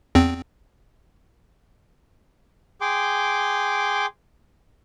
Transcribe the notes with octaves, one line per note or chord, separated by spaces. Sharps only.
E2 C4
G#4 G5 C6 D6